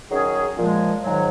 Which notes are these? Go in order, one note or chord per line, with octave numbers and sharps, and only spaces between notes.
D#3 F#3 C#4 G#4
A#2 F3 G#3
G#2 D#3 F#3